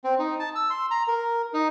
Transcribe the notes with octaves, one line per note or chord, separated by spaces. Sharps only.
C4
D#4
A5
E6
C6
A#5
A#4
D#4